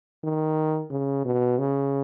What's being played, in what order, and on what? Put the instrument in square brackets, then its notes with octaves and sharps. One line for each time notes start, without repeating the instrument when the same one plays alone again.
[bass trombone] D#3
C#3
B2
C#3